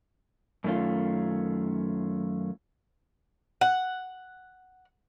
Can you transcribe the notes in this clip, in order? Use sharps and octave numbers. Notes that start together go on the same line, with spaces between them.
F#2 D#3 A3 C#4 F4
F#5